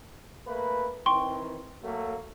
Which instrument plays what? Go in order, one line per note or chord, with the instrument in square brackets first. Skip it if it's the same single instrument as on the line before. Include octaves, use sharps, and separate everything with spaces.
[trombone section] A3 A#3 B4
[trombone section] D#3 E3 C4 [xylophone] G5 C6 C#6
[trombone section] F#3 A3 A#3